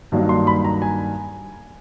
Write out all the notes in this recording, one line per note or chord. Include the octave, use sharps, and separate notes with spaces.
G2 D#3 F#3 A#3 D4
C6
B5
A#5
G#5